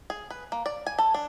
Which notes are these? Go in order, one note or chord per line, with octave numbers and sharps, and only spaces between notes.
G#4
B4
A#3
D5
G#5
A4
D4